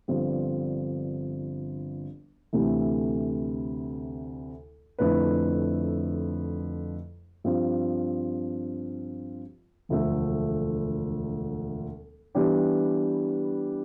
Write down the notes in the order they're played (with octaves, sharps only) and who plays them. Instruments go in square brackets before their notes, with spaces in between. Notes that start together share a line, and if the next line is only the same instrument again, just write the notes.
[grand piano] G1 G2 F3 C4
D2 C3 E3 A3 E4
F2 D3 A3 E4 B4
G2 F3 C4 F4
E1 D2 D3 F3 A3
E3 G3 B3 D4 G4